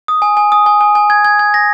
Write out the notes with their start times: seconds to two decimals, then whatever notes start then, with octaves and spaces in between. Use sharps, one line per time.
0.08 D#6
0.22 G#5
0.37 G#5
0.52 D#6
0.66 G#5
0.81 G#5
0.95 G#5
1.10 G#6
1.25 G#6
1.39 G#6
1.54 A#6